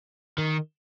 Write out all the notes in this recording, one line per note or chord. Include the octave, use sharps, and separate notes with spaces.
D#3